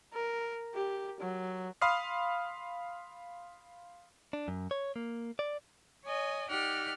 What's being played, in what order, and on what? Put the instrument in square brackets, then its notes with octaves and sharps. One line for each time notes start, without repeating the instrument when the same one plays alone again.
[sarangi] A#4
G4
F#3
[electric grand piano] F5 B5 C6 D#6 F6 C7
[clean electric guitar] D4
F#2
C#5
A#3
D5
[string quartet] C#5 D#5 G#5
D#4 G4 D5 F#5 G5 F6